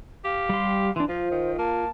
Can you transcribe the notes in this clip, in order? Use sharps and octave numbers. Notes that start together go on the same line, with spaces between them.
G4 F5
G3 C6
E3 D4 C6
F3 F4 C5
D#3
A#3 A5